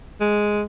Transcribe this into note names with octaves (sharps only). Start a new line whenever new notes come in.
G#3